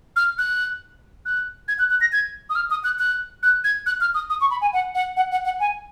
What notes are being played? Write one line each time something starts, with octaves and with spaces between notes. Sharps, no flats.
F6
F#6
F#6
G#6
F#6
F#6
A#6
G#6
D#6
F6
D#6
F#6
F#6
F#6
G#6
F#6
F6
D#6
D#6
C#6
B5
G#5
F#5
F#5
F#5
F#5
F#5
G#5